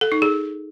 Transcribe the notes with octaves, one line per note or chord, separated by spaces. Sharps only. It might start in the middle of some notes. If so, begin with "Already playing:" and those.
A4
D#4
G#4